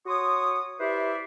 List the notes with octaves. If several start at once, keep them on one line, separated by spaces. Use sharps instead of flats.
F#4 C#5 C6 C#6 D#6
E4 G4 B4 C5 D5 E5